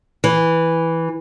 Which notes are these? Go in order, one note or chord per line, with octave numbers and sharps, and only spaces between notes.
E3